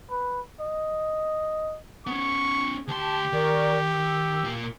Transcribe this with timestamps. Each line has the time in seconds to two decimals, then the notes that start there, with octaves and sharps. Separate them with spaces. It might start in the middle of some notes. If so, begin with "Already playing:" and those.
0.11 B4
0.61 D#5
2.07 B3 C#4 C#6
2.88 D2 G4 A5 C6
3.33 D#3 A#4 D5 C#6
3.93 E6
4.44 A#2 A#3